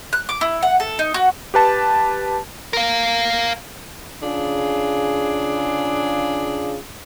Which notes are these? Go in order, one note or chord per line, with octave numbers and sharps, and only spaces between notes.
F#6
D6
E4
F#5
A4
D#4
F#4
G4 B4 A5
A#4 F5
C#3 D4 F4 G#4